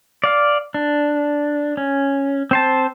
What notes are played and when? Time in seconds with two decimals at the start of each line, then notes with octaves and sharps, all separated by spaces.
0.24 D5 F5
0.74 D4
1.77 C#4
2.51 C4 C5 A5